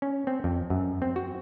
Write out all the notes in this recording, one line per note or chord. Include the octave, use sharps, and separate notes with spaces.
C#4
C4
F2
F#2
C4
F#4